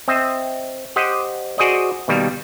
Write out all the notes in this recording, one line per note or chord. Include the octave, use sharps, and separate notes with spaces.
C4 D#5 E5
G4 C5 D#5 F#5 G5
F#4 G#4 C5 D5 D#5
B2 D#3 G3 A#3